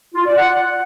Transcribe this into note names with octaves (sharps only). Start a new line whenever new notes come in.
F4
D5
F#5